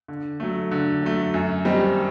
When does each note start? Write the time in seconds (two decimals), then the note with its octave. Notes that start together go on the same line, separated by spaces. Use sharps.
0.08 D3
0.40 F#3 A3
0.71 D3
1.03 F#3 A3
1.34 F#2
1.65 D#3 G3 C4 D#4